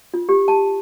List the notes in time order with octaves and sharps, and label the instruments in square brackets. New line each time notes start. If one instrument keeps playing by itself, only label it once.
[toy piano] F4
G4
A5